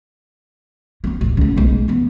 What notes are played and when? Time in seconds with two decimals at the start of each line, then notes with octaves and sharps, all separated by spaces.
1.04 A#3 C4
1.21 A1 D2
1.37 C#2 A3
1.57 B1 G#3
1.88 E3 B3